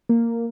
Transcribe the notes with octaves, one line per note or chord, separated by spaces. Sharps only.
A#3